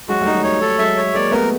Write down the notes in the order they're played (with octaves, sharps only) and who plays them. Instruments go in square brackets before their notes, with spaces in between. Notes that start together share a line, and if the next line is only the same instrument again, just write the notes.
[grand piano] F#3 G#3 [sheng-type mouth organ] F#4
[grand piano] G3 A3
[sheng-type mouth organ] D#4
[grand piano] F#3 G#3
[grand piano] G3 A3 [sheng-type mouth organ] C#5
[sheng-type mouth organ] A4
[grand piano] F#3 G#3 [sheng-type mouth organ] E5
[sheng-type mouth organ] C#5
[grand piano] G#3 A#3 [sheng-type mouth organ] D5
[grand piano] A3 B3 [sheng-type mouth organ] A#4